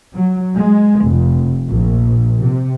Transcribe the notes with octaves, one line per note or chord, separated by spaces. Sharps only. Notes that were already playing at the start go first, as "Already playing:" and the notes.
F#3
G#3
F1
A#1
C3